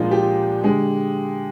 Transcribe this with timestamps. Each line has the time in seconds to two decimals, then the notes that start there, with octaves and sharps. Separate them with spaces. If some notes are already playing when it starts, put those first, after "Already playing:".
Already playing: A#2 F3 G#3 D4 D#4 F4
0.11 G4
0.63 D3 G#3